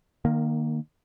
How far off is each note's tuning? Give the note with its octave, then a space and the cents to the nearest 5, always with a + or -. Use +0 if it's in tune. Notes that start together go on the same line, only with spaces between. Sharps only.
D#3 -25 A#3 +0